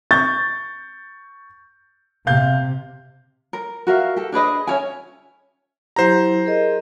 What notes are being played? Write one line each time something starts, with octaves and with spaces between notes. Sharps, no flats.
C#6 G6 A6
C3 F5 G6
A#4
F#4 A#4 E5 F5
G4 A4
D4 G#4 B4 D#5
C#4 C#5 E5 G#5
F#3 E4 G4 C5 A#5
G#4 A#4 D#5